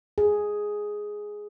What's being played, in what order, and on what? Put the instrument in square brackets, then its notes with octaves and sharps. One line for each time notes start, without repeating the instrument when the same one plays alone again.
[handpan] G#4